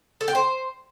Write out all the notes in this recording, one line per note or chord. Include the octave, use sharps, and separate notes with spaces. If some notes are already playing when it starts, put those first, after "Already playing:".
A4
G5
C5